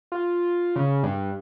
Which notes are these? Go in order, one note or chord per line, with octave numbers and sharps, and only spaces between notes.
F4
C#3
G2